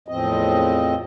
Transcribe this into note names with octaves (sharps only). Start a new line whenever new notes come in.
E2 A2 F3 C4 D#5